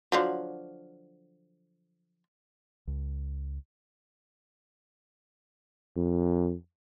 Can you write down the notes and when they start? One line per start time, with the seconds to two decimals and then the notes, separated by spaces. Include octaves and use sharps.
0.12 D3 F3 F#3
2.87 C#2
5.96 F2